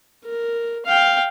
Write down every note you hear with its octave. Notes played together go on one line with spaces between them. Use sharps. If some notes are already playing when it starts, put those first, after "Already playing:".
A#4
F5 G5